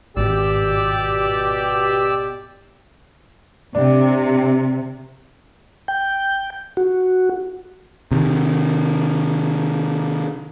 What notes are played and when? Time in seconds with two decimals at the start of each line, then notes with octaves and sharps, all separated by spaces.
0.16 G#1 B2 G4 D5 E6
3.75 C3 D4
5.88 G5
6.77 F#4
8.12 C3 D#3